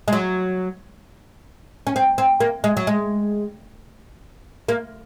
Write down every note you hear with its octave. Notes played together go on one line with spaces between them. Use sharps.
G#3
F#3
C#4
C4
C4
A#3
G#3
F#3
G#3
A#3